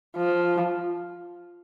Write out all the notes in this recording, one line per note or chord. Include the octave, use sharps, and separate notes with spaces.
F3